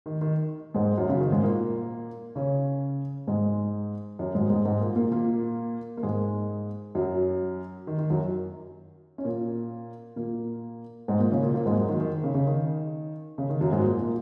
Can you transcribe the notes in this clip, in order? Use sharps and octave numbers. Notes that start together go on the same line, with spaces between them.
D#3
D#3
G#2 G#3
F#2 F#3
C#3
D#3
G#2 G#3
A#2 A#3
C#3 C#4
G#2 G#3
F#2 F#3
G#2 G#3
G#2 G#3
G#2 G#3
A#2 A#3
A#2 A#3
A#2 A#3
A#3
G#2 G#3
F#2 F#3
D#3
D#3
F#2 F#3
C#4
A#2 A#3
A#2 A#3
G#2 G#3
A#2 A#3
C#3 C#4
A#2 A#3
A#2 A#3
G#2 G#3
F#2 F#3
D#3
D#3
C#3
C#3
D#3
C#3
D#3
F#2 F#3
G#2 G#3
A#2 A#3
A#2 A#3